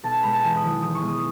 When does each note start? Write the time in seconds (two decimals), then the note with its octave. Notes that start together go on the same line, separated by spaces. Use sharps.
0.03 B1 A5
0.14 G#5
0.23 B2 G#3 B5
0.33 A5
0.43 E2 G#5
0.56 D#6
0.62 D#3 F#3
0.81 E2 D#6
0.95 C#6
1.01 B2 G#3
1.08 D#6